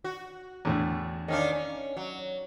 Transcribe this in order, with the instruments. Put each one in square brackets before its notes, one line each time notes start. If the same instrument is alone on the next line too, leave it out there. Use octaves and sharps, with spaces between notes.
[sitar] F#4
[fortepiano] E2 A2 D3
[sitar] D#3 C#4 D4 [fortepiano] D#5 F5
[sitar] C#4
F#3